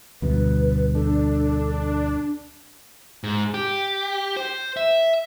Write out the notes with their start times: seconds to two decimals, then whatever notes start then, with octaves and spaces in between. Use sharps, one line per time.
0.22 D2 G2 B2 B4
0.95 D4 A4
3.24 G#2
3.54 G4
4.37 C5
4.77 E5